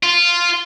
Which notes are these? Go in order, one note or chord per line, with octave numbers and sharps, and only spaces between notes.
F4